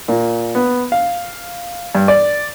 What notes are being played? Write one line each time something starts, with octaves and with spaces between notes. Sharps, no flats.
A#2
B3
F5
G2
D5